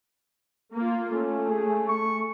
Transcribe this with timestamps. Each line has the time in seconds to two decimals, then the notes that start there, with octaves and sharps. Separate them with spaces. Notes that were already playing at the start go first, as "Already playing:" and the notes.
0.74 A#3 F4
1.13 A3 C#4
1.50 G#4
1.89 C#6